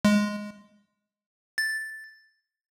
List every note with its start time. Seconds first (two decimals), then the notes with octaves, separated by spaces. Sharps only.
0.05 G#3
1.58 A6